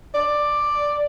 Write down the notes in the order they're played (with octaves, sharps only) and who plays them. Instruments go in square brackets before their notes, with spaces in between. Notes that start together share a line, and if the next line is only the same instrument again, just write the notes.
[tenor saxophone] D5